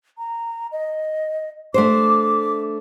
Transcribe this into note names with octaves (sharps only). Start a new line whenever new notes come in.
A#5
D#5
A3 D4 C5 D6